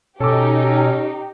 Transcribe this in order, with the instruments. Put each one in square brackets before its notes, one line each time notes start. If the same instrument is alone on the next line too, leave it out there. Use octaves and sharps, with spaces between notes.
[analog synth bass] B2 [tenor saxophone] C#4 [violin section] D#4 G4 [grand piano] A4 D6